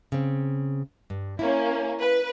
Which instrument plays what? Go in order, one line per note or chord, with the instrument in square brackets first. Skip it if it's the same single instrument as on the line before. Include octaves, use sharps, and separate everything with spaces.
[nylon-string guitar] C#3 C4
G2
[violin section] A#3 C#4 [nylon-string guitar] E4
[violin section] B4